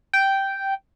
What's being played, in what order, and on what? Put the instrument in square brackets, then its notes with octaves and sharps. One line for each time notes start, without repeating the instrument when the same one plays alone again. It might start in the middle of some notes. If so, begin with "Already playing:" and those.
[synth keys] G5